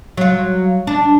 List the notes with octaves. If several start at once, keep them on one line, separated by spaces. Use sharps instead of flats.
F#3 F4
D4